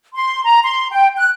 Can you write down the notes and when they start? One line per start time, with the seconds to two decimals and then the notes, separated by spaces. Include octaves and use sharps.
0.14 C6
0.45 A#5
0.63 C6
0.91 G5
1.16 F#6